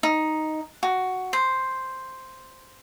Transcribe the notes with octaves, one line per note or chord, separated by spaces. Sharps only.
D#4
F#4
C5